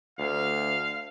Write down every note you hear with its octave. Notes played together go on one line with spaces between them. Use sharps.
D2 F5